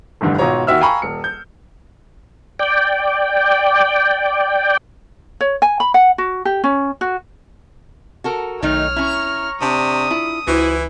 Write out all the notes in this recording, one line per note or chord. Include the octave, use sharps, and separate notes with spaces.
F1 C2 G2 D3
G#1 B2 F4 C#5 A#5
D#2 F#4 E5 E6 F6
F5 G5 G#5 A#5 B5 C#6
D#1 C#7
G6
D5 G5
C#5
G#5
B5
F#5
F#4
G4
C#4
F#4
F#4 A4 A#4
B1 D#3 A3 D#4 C#5 F6
C#4 E4 A#5 C#6
C3 D4 D#6
E4 F4
C#2 E3 E4 F#4 C5